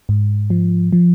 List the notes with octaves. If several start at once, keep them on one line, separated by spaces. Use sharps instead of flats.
G#2
F3
F3